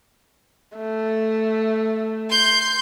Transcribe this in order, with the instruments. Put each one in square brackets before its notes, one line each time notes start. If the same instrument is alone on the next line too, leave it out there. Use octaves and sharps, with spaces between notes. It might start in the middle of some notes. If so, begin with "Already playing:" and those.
[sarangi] A3
[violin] C6 G6